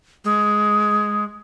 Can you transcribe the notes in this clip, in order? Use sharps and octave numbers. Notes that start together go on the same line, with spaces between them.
G#3